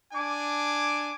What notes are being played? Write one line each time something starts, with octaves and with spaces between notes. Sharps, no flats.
D4 G#5 D6